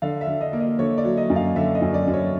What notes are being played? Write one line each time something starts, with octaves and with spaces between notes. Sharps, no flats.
D3 F5
E5
D3
D#5
A#3
D#5
D3 C#5
D5
F#3
D#5
F#2
F5
D3 E5
D#5
F#2
D5
F#2
C#5